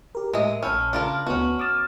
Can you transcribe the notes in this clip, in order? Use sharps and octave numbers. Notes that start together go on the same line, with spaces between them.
G4 A#4
A2 G#3 A#4 D#5 E5
A#1 C#4 G5 A5 B5 E6 F6
C#3 D4 F4 A#4
D2 B3 C#4 F#4
D6 D#6 F6 A6 E7